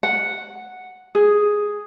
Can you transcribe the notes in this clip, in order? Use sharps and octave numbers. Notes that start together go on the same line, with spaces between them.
F#5
G#4